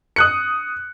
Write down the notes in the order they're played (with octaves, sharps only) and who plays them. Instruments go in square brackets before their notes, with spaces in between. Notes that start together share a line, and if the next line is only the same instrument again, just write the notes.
[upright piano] D#6 F#6 C#7